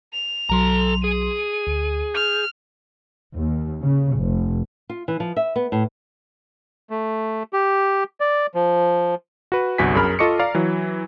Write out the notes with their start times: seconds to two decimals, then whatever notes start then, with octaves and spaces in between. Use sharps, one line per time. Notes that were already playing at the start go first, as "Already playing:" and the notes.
0.13 F7
0.50 B1 F#3 A4 A#5 C6
1.04 G#4 D#7
1.67 D2
2.14 F6 G6
3.34 D#2
3.82 C#3
4.17 F1
4.89 F4
5.08 E3
5.20 F3
5.36 E5
5.56 B3
5.72 A2
6.90 A3
7.53 G4
8.20 D5
8.55 F3
9.52 F#4 B4
9.78 G1 C2 F#4 G#5 B6
9.95 F#2 G#4 A#4 B5 F6
10.19 F4 A4 D#5 C#6 D6 C#7
10.40 D5 F5 A#5
10.55 E3 F#3